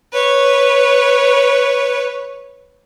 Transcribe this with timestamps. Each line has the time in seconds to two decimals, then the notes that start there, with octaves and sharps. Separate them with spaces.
0.13 B4 C#5